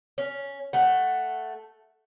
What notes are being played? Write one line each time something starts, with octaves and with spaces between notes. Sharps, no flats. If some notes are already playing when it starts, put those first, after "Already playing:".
C#4
A3 F#5